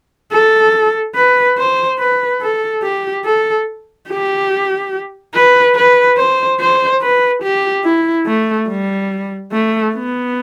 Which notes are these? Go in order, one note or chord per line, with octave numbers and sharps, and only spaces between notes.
A4
B4
C5
B4
A4
G4
A4
G4
B4
B4
C5
C5
B4
G4
E4
A3
G3
A3
B3